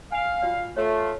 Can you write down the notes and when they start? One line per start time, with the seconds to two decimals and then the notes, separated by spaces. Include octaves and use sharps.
0.12 F5 G#5
0.42 F4 F#4 D5
0.76 A3 F4 C#5 E5